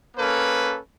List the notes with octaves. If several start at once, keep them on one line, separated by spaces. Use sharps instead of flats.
A#3 C#4 A4 B4